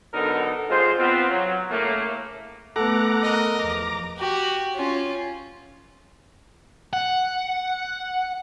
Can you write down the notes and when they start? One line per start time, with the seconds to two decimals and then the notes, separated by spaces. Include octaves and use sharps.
0.13 D3 F#3 B3 D#4 A4 A#4
0.70 G#1 G#3 F4 G#4 C5
0.98 B3 C4 F4
1.30 F#3
1.71 A2 C#3 A3 A#3
2.76 A3 B3 A4 F#5 A#5 D6
3.22 A#4 D#5
3.59 E2 F3 A#5 D6
4.18 F#4 G4
4.76 C#4 F4
6.93 F#5